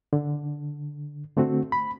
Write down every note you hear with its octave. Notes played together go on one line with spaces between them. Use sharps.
D3
D3 A3 C4 F#4
B5